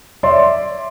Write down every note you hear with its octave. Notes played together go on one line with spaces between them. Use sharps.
C#5 D5 E5 C6